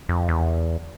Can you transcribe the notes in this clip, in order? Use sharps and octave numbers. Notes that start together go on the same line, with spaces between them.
F2
E2